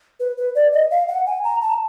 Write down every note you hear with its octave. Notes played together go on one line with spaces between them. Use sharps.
B4
B4
D5
D#5
F5
F#5
G#5
A#5
A5